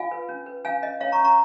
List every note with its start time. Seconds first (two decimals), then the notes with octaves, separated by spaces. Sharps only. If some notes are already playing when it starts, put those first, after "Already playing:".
Already playing: F4 F5 G#5
0.11 B4
0.29 C#4
0.46 B4
0.65 C#4 F5 G#5
0.82 C#4 D#5
1.01 C#4 C#5 F5
1.12 A#5 C#6
1.18 C#4
1.24 A#5 C#6